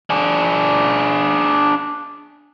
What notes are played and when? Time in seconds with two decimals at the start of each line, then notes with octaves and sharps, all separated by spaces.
0.10 D4 G#4